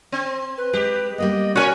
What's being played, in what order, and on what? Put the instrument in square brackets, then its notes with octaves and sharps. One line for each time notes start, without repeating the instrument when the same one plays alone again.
[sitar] C4
[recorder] B4
[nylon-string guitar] G#3 [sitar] G4
[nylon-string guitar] G3 A#3 B3 [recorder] D#5
[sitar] C#4 C#5 [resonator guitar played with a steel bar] F#4 G#5 [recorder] A#4